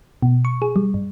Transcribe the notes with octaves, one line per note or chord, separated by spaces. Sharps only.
B2
C#6
G#4
G3
G2